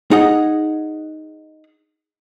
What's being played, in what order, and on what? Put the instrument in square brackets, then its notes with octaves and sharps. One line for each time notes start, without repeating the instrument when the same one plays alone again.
[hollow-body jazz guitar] D#4 G#4 D#5 F#5